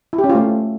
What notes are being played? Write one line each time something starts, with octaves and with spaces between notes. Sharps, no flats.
E4
G4
C#4
F4
A3